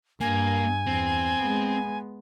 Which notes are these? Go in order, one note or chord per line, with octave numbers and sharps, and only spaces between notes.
G2 A#3 G#5
E2 C4
G#3 B3